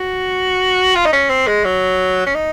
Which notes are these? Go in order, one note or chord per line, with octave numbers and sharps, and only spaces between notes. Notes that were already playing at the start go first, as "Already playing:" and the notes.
Already playing: F#4
F4
D#4
C#4
C4
G#3
F#3
C#4
D#4